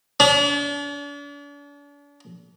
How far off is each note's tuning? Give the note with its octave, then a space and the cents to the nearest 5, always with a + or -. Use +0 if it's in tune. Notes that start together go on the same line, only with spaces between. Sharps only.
D4 -40